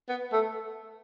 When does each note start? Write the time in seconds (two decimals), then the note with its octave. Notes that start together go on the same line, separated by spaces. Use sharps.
0.09 B3
0.33 A3